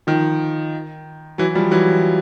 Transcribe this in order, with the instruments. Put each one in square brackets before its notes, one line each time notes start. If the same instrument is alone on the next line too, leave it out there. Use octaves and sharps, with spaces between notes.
[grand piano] D#3 F3
E3 F#3
F3 G3
E3 F#3